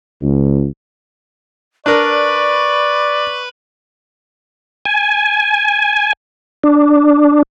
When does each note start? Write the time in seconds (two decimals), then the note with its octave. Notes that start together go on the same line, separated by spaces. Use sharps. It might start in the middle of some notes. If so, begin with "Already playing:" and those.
0.22 C#2
1.86 D4 A#4 B4 D5 B5 C#6
4.85 G#5
6.63 D4